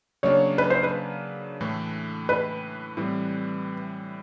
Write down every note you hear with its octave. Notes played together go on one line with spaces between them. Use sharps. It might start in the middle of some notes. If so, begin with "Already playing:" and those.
C#3 F#3 A#3 D4 C#5
B4
C5
B4
A2 E3 A3
B4
A2 E3 G3 C4